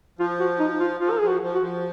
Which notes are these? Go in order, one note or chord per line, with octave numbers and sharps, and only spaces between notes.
F3 F4
F#4
D#4
F4
F3 F4
A#4
F3 G#4
F#4
F3
F#4
F3